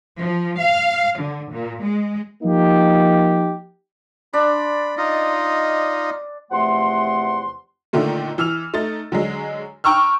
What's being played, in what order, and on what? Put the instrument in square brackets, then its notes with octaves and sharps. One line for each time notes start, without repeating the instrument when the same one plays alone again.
[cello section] F3
F5
D3
A#2
G#3
[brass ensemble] F3 A#3 D#4 G4
[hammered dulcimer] D4 D5 C6 [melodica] B5
[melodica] D#4 F4 D#5
[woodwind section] E2 C3 F3 A3 F#5 C6
[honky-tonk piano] A#2 D3 D#3 A3 A#3
E3 E6 F6 F7
A3 D#4 A6
D3 F#3 G#3
G5 A#5 C#6 E6 F6